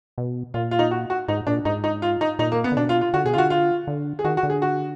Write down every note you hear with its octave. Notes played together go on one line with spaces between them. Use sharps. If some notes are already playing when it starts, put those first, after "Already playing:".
B2
A#2 F4
F4
D#4
F#4
F#4
G#2 D#4
A#2 D4
G#2 D#4
D#4
F4
D#4
A#2 D#4
A#3
B3
D3
B2 D4
F4
F4
D3 F#4
B2 G#4
D3 F4 F#4
F4
D3
G#4
D#3 F#4
F#4
D3
G#4
F#4